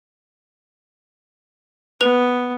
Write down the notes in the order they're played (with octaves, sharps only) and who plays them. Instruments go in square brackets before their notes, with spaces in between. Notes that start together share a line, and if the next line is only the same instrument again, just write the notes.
[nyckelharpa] B3 [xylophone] B4 F7